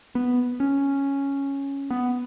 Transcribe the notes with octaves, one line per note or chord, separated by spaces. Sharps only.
B3
C#4
B3